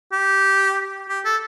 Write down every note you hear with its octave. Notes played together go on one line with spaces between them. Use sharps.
G4
G4
A4